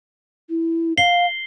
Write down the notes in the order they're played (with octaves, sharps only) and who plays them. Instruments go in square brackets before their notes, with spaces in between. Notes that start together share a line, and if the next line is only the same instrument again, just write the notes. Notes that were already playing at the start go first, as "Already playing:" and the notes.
[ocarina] E4
[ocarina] F5 [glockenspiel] C7 G7